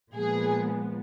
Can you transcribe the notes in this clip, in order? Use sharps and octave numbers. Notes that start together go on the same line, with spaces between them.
A#2 F3 G#3 B3 G#4